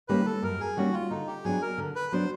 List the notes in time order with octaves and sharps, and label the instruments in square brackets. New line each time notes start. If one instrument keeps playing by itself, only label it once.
[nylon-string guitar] D#3 G3 A#3 C#4 [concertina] B4
[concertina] A4
[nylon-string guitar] F#2 [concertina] A#4
[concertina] G#4
[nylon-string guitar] D#3 G3 A#3 C#4 [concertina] F#4
[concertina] F4
[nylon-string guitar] D3 [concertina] D#4
[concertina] G4
[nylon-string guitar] F#3 B3 D4 [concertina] G#4
[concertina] A#4
[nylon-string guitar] D3
[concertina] B4
[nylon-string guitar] F#3 B3 D4 [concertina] C5